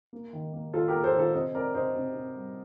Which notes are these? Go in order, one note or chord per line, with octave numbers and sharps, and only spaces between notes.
A#3
D#3
A#3
D#3 F4 A4
G4 A#4
A#3
A4 C5
D#3 F4 A4
C3 C5 D#5
C4 A#4 D5
C3 C5 D#5
C3
C3
G3